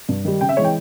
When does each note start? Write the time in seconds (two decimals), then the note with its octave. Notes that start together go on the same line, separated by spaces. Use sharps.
0.09 G2
0.25 D#3 G3
0.41 C#3 G5
0.49 E5
0.57 E3 G#3 C#5
0.64 G5